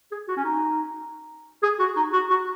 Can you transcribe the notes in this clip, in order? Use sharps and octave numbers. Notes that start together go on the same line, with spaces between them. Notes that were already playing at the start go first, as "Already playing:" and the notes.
G#4
F#4
C#4
D#4
G#4
F#4
D#4
F#4
F#4